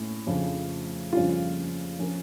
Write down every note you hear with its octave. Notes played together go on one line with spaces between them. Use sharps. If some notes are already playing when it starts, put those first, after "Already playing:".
Already playing: A2 C#4
F2 C#3 F3
F2 C#3 G3 C#4 F4
F3 C#4 F4 A#4